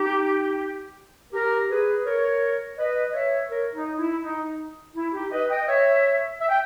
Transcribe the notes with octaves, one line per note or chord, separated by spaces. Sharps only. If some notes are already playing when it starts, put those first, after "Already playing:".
Already playing: D#4 G4
G4 A#4
G#4 B4
A#4 C#5
B4 D#5
C#5 E5
A#4 C#5
D#4
E4
D#4
E4
D#4 G4
B4 D#5
D#5 G5
C#5 E5
E5
G5